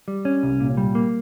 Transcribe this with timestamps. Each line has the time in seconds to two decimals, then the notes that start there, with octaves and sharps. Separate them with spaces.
0.08 G3
0.25 C#4
0.43 C2
0.60 A#2
0.77 G3
0.95 A#3